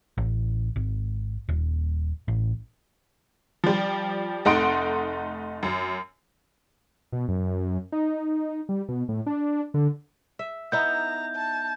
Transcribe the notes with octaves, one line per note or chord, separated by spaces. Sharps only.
A1
G#1
D#1
A1
F3 G3
F1 A3 D#4 F#5 C6 D7
F#2
B2
F#2
D#4
G3
B2
A2
D4
D3
E5
B3 D#4 E4 A#5 G6
A5